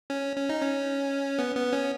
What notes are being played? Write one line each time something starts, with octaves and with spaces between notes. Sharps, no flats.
C#4
C#4
D#4
C#4
B3
B3
C#4